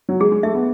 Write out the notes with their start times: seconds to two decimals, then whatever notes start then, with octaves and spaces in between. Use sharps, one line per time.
0.09 F#3
0.20 G#3 G#4
0.32 G#3
0.43 A3 E5
0.54 B3